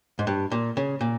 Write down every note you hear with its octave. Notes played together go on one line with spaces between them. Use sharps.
G#2
G2
A#2
C#3
A#2